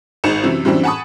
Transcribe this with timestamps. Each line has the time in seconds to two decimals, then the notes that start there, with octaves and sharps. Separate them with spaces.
0.24 G#1 D#4 C#7 E7
0.43 F#2 C3 E3
0.65 F#2 E3 G3 C4 D4
0.84 F#5 G#5 A5 B5 C#6 D#6